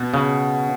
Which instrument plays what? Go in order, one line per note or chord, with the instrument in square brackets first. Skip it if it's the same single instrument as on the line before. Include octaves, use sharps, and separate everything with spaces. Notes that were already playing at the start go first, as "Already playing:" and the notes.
Already playing: [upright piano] B2
[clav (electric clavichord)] C#3